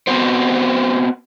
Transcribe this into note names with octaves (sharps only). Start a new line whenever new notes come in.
B3 C4 F#4 C5